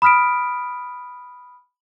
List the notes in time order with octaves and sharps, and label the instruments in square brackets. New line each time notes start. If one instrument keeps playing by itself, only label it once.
[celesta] B5 D#6 F6 B6 D7